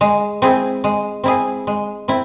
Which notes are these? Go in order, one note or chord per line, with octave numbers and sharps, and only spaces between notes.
G#3
C4 E4 G#4
G#3
C4 E4 G#4
G#3
C4 E4